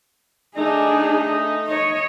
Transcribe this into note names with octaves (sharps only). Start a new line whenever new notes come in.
A3 D4 D#4 G#4
C#5 D#5